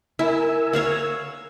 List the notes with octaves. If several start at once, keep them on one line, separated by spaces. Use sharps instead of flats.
E4 A#4 G#5 E6
C#5 F5 F#5